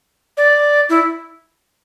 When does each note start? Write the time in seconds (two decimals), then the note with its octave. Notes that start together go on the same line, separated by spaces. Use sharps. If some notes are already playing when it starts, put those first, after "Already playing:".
0.37 D5
0.90 E4